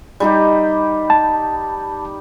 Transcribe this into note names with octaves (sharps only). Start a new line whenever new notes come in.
G3 D#4 G4
A5